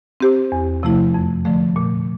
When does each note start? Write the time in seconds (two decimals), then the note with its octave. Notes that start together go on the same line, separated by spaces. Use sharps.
0.20 C4 G4 C5
0.52 E2
0.83 C3 F3 A3 E4
1.14 F2
1.45 D3 F3 A3
1.76 A#2